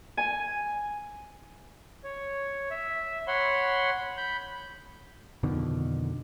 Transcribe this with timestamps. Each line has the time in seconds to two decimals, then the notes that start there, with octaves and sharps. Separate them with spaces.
0.17 G#5
2.04 C#5
2.70 E5
3.27 C#5 F#5 B5 C6
4.17 B5 G6
5.43 F2 B2 D3 D#3